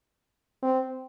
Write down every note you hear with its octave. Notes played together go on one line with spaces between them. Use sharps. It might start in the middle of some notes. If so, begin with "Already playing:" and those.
C4